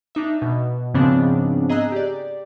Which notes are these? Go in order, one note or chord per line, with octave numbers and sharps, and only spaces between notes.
D4 D#4 E5
B2
G#2 C#3 F3 B3 C4 D4
G#4 D#5 A#5 E6 F#6
G4 D5